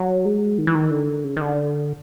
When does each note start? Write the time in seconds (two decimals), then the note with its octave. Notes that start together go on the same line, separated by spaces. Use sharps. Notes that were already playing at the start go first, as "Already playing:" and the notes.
Already playing: F#3
0.25 G#3
0.58 D#3
0.67 E3
0.75 D#3
0.91 D3
1.24 C#3
1.37 D#3
1.41 D3